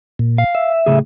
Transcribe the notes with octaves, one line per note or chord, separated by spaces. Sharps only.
A#2
F5
E5
A2 C#3 G#4